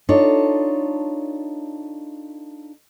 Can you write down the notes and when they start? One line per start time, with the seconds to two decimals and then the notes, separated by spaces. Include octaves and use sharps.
0.09 D4 D#4 F4 A4 C#5